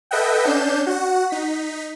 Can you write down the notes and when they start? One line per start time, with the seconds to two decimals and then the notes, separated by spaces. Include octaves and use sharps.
0.11 A4 B4 D#5 E5 F#5 G5
0.45 C#4 D4 G6 C7 E7
0.87 F#4 F#5
1.30 D#4 B6